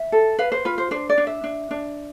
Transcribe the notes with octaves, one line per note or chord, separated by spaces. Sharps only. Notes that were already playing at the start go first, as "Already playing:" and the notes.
Already playing: E5
A4
B4 F5
C5
F4 B4
C5
D4 C5
D5
D4
E5
D4
D4